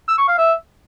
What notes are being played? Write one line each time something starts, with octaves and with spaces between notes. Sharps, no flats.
E6
C#6
F5
E5